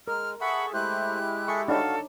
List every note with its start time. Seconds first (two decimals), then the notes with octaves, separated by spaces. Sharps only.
0.08 G#3 A#4 F6
0.41 G#4 A4 E5 F#5 B5 C#6
0.73 G#3 A3 E4 G4 C5 F#6
1.48 G#4 A4 E5 C#6
1.68 D4 D#4 F#4 A4 C#5 F5